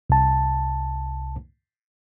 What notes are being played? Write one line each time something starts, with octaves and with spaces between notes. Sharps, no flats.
C2 A5